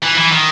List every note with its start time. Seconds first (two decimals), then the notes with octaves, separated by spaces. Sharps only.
0.03 E3
0.17 E3
0.32 D#3